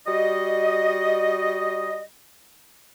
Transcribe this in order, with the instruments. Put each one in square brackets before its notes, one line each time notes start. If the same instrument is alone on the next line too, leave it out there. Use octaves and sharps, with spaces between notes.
[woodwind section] G3 F#4 D#5